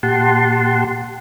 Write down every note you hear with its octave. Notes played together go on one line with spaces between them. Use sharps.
A#2 G4 F#5 A5 C6